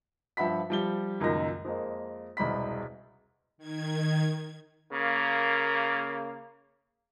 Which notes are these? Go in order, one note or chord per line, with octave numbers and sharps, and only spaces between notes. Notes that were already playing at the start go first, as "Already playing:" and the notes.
G2 F3 E5 F#5 B5 B6
F3 G3 G7
C#2 F#2 A#2 D#3 D#4 A#6
F2 G#3 A#3
E1 C2 G#3 B5 B6
D#3 G#6
C#3 A#3